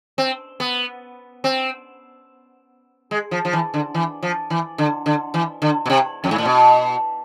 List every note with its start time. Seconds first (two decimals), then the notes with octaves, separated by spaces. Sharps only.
0.18 C4
0.60 B3
1.44 C4
3.11 G#3
3.31 F3
3.45 F3
3.53 E3
3.74 D3
3.94 E3
4.23 F3
4.50 E3
4.78 D3
5.06 D3
5.34 E3
5.62 D3
5.86 B2
5.90 C3
6.24 F2
6.31 G#2
6.38 A2
6.46 B2